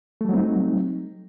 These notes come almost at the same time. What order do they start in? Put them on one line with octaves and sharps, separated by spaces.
A3 G3 F#3 C4 D#4